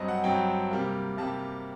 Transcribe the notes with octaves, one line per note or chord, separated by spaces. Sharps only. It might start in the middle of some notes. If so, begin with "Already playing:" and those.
Already playing: G2 F#3 C4 D#5
F#5
G2 F#3 C4 G5
C3 G3 A#3
C3 G3 A#3 A5